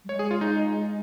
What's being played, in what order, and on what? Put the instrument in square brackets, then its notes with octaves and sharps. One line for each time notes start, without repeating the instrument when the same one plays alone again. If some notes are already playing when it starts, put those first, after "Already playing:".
[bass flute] G3
[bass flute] G#3 [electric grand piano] C#5
[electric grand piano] G#4
F4
D#4